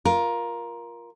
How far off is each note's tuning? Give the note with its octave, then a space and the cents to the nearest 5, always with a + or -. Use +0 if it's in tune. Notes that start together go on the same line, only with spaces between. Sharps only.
F4 +0 A#4 +15